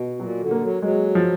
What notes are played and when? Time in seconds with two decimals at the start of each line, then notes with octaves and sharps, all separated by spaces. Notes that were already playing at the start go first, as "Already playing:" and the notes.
Already playing: B2
0.19 A#2 F#3
0.41 D3
0.51 A#3
0.62 F#3
0.82 F#3 G#3
1.15 F3